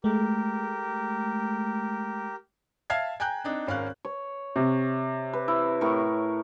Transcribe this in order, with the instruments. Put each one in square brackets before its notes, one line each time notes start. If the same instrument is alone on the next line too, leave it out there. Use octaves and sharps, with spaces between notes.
[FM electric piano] G#3 A3 [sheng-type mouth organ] G4 A#4
[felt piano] E5 F5 A5 F6 G#6 C7
G5 G#5 A#5 F#6 G6
C4 D4 D#4
G#1 C#4 A#4 F5 F#6
[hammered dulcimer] C#5
[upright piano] C3 [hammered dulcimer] C#6
[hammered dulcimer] B4
E4
A2 A#4 C#6